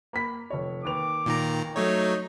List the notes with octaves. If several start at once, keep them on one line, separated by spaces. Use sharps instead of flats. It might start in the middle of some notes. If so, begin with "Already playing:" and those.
A#3 B5 B6
F1 C#5
D#2 B4 D6 F7
A#2 D#3 A#5
F#3 A3 D#4 C#5